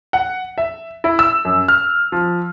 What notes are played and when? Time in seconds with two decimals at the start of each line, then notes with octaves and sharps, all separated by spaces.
0.13 F#5
0.58 E5
1.04 E4
1.19 E6
1.45 F#2
1.68 F6
2.12 F3